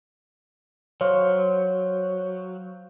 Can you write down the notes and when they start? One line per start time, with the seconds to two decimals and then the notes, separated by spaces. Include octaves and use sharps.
1.01 F#3 C5 C#5 F5 C#6